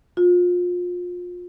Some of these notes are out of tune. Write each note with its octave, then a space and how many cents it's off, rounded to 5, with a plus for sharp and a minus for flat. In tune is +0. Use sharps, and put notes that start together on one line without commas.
F4 +30